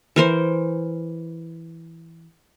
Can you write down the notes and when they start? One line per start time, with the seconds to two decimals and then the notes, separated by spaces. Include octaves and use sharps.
0.16 E3 A#4 C5